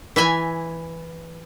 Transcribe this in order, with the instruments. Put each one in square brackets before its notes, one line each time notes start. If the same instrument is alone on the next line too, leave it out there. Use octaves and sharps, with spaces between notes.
[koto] E3 E5 G#5